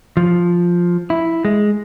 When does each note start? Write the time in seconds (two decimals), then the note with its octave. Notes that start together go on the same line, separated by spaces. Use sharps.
0.17 F3
1.10 E4
1.45 G#3